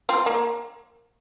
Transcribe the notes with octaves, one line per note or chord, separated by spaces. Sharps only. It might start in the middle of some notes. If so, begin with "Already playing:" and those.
C4 F4
A#3